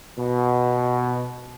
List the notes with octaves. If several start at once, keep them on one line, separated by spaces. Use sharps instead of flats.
B2